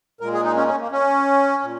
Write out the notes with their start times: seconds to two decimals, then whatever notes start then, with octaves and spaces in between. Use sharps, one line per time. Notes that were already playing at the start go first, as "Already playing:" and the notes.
0.20 A#2 G#3 A#4
0.33 G#4
0.44 D#4
0.56 C#4
0.68 C#4
0.79 A#3
0.91 C#4
1.62 A#2